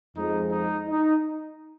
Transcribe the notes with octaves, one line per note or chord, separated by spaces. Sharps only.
F2 F3 G#3 D#4
D#4
D#4